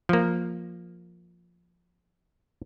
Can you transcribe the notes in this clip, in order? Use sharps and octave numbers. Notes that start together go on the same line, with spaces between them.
F3 A#3